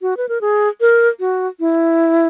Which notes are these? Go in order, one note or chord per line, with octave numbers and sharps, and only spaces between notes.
F#4
B4
A#4
G#4
A#4
F#4
E4